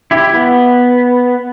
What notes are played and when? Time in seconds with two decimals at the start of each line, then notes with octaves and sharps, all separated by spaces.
0.11 E4 G4
0.34 B3